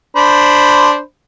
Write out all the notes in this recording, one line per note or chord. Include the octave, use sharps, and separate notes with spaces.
D4 C5 B5